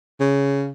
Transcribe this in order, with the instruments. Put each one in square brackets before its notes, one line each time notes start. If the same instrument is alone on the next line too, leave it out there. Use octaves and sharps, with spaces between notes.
[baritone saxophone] C#3